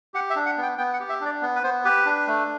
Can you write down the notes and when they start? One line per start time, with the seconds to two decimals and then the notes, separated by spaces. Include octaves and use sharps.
0.14 G4 F#5
0.30 E5
0.36 D4
0.46 F#5
0.57 B3
0.63 G5
0.78 B3 G5
0.94 F#5
1.00 G4
1.09 E5
1.21 D4 D5
1.42 B3
1.55 B4
1.63 B3 C5
1.85 G4 B4
2.06 D4
2.27 A3